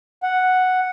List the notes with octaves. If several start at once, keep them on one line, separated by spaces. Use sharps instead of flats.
F#5